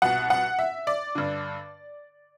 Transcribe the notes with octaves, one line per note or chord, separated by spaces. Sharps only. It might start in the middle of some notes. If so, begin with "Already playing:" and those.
C2 B2 F#5
F#5
E5
D5
G2 D3